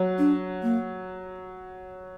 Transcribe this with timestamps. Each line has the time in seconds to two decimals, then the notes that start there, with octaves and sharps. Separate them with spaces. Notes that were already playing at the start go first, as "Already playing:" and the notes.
Already playing: F#3
0.18 D4
0.63 A#3